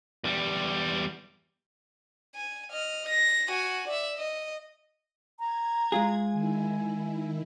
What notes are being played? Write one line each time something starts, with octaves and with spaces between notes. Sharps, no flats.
E2 G3
G#5
D#5 F6
A#6
F#4 G#5
D5 E5
D#5
A#5 G#6
G#3 F4 G#4
D#3 E4 G#5